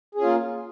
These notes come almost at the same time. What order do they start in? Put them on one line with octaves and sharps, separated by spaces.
G#4 C#4 F4 A#3